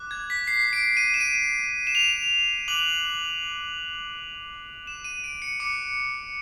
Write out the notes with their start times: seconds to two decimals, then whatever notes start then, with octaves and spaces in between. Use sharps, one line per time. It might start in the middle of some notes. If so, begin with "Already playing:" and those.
Already playing: D6 F#6
0.11 G#6
0.30 B6
0.47 C7
0.73 D7
0.97 D#7
1.14 E7
1.21 D#7
1.87 E7
1.95 F7
2.68 D6 F#6 F#7
4.87 E7
5.04 D#7
5.24 D7
5.42 C#7
5.60 D6 F#6 C#7